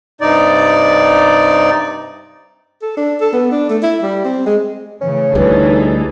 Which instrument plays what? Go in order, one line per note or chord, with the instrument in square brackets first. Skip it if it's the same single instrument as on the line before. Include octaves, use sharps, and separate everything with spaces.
[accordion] G2 C3 D#4 D5
[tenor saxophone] A4
D4
A4
B3
D4
A3
E4
G3
C4
G#3
[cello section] A2 C#3 E3 [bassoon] C#4
[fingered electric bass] D2 G3 [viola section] E3 [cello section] D#4 G#4 A4